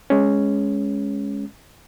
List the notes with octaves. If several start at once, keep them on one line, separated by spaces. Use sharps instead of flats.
G#3 C#4